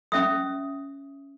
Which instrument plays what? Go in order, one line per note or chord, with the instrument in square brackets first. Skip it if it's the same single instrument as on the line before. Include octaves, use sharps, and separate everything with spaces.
[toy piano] C#4 E5 D#6